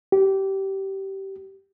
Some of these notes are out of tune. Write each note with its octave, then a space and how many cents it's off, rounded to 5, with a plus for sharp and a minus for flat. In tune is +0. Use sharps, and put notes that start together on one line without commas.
G4 -20